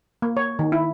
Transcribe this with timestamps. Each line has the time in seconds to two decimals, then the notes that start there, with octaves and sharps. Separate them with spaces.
0.22 A#3
0.37 C#5
0.59 D#3
0.72 E4